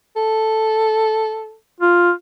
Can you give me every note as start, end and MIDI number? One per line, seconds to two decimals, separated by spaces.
0.16 1.54 69
1.80 2.11 65